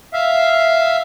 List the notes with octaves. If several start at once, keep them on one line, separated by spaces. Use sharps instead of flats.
E5 F5